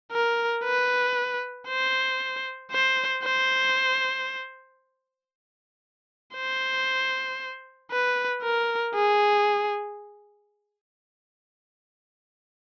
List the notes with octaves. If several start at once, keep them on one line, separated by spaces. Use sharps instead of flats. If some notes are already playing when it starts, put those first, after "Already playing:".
A#4
B4
C5
C5
C5
C5
B4
A#4
G#4